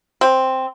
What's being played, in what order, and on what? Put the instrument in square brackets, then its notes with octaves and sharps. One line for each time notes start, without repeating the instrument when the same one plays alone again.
[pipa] C4